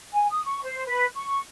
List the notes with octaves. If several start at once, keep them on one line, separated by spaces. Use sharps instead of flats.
G#5
D#6
C#6
C5
B4
C#6